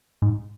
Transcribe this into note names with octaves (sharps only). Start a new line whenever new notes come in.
G#2